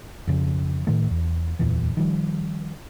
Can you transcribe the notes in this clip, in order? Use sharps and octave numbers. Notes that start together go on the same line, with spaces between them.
F2 C#3
A2 D#3 A3
E2
D1 E2 A#2 E3
D#3 F3 G3